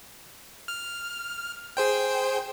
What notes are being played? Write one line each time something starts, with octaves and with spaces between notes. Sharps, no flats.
F6
G#4 C5 G5